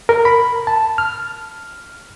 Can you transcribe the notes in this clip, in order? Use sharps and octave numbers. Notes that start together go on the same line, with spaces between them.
A#4
B5
A5
F6